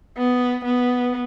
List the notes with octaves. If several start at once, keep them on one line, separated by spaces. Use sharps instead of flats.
B3
B3